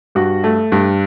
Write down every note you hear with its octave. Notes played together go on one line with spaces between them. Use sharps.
G2 F#4
A3
G2